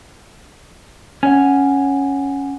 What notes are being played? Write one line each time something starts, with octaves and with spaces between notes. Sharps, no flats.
C#4 F#5 G#5